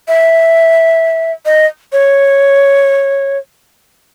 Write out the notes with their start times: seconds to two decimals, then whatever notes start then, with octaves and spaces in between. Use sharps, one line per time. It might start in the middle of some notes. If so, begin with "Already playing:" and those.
0.08 E5
1.45 D#5
1.92 C#5